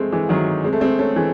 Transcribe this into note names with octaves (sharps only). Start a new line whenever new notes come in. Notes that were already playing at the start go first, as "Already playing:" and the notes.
Already playing: G#3 A3 C4
E3 G#3
D#3 F#3
G#3 C4
A3
G#3 C4
A3 C#4
E3 G#3